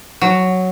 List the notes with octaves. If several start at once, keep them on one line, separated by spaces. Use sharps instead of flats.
F#3